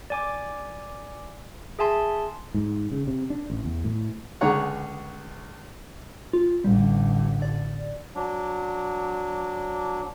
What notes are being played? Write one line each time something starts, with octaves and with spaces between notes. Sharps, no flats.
D5 G#5 D6
G#4 E5 G#5 A5 C6
G#2
C#3
C3
D4
A1
E2
A2
C#2 D3 G#4 C#5 F#5 A#5
F4
A1 D3 G3
D5
F#3 D4